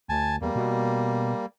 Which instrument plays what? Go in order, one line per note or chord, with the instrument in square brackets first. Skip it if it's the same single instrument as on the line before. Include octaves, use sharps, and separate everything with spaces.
[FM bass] D2 [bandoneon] G#5 A5
[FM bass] E2 [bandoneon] G3 A#3
[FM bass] B2